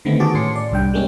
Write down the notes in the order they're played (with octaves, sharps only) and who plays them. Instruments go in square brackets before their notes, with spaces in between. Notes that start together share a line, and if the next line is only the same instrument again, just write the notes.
[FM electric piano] D3 D#3 A3 B3 C4
F#4 G#4 A5 D6
A2 C#4 C6 C#7
D5
C2 G2 G5
G3 G#3 A#3 C#4